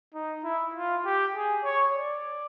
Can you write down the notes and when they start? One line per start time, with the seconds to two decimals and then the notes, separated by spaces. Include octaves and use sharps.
0.14 D#4
0.44 E4
0.75 F4
1.05 G4
1.35 G#4
1.64 C#5
1.95 D5